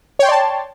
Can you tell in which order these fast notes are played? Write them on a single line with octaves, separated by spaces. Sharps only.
C#5 G5 C6 D5 A5